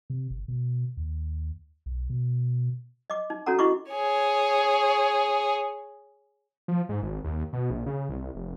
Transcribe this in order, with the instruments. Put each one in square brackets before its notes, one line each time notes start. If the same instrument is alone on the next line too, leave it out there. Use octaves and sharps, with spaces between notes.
[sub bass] C3
G1
B2
D#2
B1
B2
[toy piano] D#5 D6
D#4
C#4 D4 F#4 A4 F#5 A#5
E4 F#4 D#5 B5 C#6 D6
[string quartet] G#4 C#5
[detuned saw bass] F3
G#2
G#1
D#2
B2
A#1
C#3
C2
F1